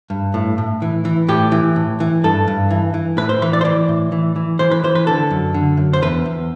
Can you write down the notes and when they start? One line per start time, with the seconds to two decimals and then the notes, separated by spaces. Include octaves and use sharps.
0.10 G2
0.34 A2
0.58 A2
0.82 E3
1.05 E3
1.28 A2 G4
1.52 E3
1.76 A2
2.00 E3
2.24 G2 A4
2.48 G2
2.71 E3
2.94 E3
3.17 A2 B4
3.29 C5
3.42 E3 B4
3.53 D5
3.61 C5
3.65 E3 D5
3.88 A2
4.12 E3
4.36 E3
4.59 E3 C5
4.71 B4
4.83 E3 C5
4.95 B4
5.07 D3 A4
5.31 F#2
5.54 D3
5.77 F#2
5.93 C5
6.02 E2 B4
6.26 E2